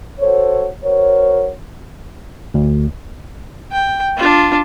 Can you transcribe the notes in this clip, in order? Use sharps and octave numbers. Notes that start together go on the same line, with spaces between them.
F#4 A4 C5 C#5
F#4 A#4 C5 C#5
D2
G5
D4 F4